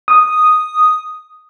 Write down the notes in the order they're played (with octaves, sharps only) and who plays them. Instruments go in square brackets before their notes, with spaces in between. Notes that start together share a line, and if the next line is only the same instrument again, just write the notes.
[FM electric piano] D#6